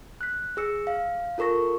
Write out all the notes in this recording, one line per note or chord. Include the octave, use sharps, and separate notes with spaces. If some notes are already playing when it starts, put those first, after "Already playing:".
F#6 B6
G#4 E6 C#7
F5
F4 A4 A#4 C#6 A#6